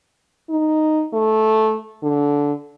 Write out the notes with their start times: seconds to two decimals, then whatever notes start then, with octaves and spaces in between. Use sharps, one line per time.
0.50 D#4
1.13 A3
2.03 D3